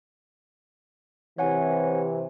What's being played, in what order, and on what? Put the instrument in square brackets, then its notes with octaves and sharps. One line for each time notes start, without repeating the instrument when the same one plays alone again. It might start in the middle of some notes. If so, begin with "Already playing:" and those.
[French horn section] C3 E3 [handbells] C#5 F#5 G#5